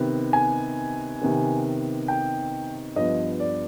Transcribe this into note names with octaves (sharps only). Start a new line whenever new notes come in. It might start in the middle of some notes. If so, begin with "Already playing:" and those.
Already playing: C3 D#3 B3
G#5
C3 D#3 B3
G5
G2 F3 B3 D#5
D5